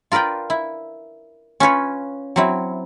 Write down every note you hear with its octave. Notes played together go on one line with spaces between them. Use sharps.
F4 A#4 B4 D5 G5
E4
C#4 F4 B4 C#5
F#3 C4 E4